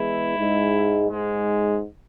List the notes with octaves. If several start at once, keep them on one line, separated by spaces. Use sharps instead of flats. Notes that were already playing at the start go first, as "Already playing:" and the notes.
Already playing: E2 E3 G#3 E4
G#2 G#3
G#2 G#3